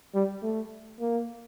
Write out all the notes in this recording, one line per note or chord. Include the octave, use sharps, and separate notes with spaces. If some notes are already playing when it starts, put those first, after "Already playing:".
G3
A3
A#3